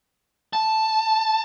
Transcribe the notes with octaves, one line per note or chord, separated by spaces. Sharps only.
A5